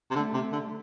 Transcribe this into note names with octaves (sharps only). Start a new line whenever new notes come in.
C3
D3 A3
C3
D3